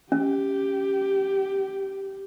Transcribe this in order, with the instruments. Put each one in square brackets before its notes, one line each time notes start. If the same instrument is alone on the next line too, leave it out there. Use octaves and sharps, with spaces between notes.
[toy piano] C#4 [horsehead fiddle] G4